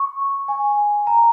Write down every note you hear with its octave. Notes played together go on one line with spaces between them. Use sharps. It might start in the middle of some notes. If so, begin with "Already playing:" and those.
Already playing: C#6
G#5
A#5